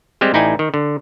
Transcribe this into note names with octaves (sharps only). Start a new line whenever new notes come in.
G3 G#3 C4 G4
A1 D#4 E4 D5 G5 G#5
D#3
D3